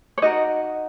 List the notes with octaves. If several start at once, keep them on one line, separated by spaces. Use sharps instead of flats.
C#5
D#4 F#4 A#4 D#5